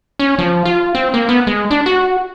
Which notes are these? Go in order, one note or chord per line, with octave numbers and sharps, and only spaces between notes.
C#4
F3
F4
C4
A#3
B3
G#3
D4
F#4